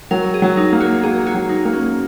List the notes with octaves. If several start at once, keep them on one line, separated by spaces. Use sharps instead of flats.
F#3 A#4
G#4
F#3
D#4
A#3
F#4
A#3 G#4
F#4
F#3
D#4
A#3
C#4